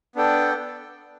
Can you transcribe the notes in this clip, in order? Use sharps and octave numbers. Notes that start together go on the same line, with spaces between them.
B3 D4 A4 G5